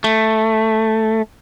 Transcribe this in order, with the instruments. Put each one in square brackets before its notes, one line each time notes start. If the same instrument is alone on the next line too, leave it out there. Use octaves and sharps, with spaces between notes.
[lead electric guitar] A3